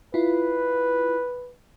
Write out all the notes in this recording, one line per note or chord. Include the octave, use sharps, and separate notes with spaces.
E4 F4 B4